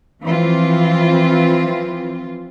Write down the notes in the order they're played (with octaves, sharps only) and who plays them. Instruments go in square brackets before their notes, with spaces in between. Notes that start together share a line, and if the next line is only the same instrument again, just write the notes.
[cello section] E3 F3 C4 F4